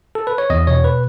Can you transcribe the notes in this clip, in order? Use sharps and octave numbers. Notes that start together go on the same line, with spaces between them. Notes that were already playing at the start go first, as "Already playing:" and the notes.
A4
B4
C#5
E2 D#5
B2 C#5
B4